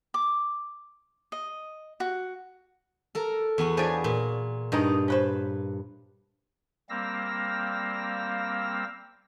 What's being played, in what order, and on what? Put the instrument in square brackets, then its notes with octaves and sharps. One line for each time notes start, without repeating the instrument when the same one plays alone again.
[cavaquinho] D6
D#5
F#4
[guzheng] A4 A#4 A#5
E2 B3 F#4
[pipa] F3 D4 C#5 [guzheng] G#4 B4 G#5
[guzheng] A#2
[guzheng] G2 [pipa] D#3 G#3 D#4
[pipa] C#4 B4 C5
[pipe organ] G3 A#3 C4 F5 E6 A#6